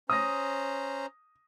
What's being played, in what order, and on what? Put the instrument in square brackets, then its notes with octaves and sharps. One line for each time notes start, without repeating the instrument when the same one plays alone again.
[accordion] C#4 C5 A#5 [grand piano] D#6 A#6